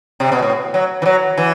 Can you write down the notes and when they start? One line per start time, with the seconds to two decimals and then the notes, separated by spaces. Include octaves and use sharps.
0.20 C3
0.32 B2
0.42 A2
0.74 F#3
1.02 E3
1.06 F#3
1.37 E3